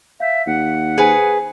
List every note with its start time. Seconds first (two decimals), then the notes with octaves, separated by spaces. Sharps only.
0.20 E5 F5 G6
0.46 D#2 F#5
0.98 G#4 B4 C5 G#5